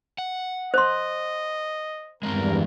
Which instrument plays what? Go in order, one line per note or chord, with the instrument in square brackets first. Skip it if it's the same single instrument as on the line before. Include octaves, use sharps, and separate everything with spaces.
[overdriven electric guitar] F#5
[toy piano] C5 C6 [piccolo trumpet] D#5
[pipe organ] E2 G2 [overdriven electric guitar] G#3 C4 [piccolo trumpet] A#4